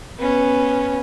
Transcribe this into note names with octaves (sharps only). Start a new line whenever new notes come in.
B3 C#4